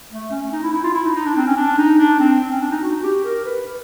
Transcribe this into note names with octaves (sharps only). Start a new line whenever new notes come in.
A3
C#4
C#4
D#4
E4
E4
F4
E4
D#4
D#4
D4
C4
C#4
D4
D#4
D4
C4
C4
C#4
D4
D#4
F#4
G4
A#4
B4
B4